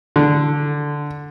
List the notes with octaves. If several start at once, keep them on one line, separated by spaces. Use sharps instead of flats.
D3